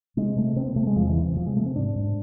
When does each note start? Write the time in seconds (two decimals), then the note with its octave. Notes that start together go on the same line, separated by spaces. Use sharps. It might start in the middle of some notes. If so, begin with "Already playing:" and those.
0.17 C3 G#3
0.37 C3 A3
0.56 C3 C4
0.66 B3
0.76 C3 A3
0.87 G#3
0.96 E2 F3
1.09 E3
1.17 C3
1.36 C3 F3
1.46 G#3
1.56 C3 A3
1.66 C4
1.76 G#2 D4
1.96 G#2